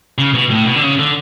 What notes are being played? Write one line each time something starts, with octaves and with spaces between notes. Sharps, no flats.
C#3
B2
A2
B2
D3
C#3
D3